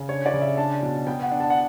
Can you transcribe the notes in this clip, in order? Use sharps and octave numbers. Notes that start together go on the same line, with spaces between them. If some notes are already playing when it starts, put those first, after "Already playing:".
Already playing: C#3
D4 C#5
D5
C#3
E5
D4 A5
B2
B3 G5
F#5
D4
A5
F#5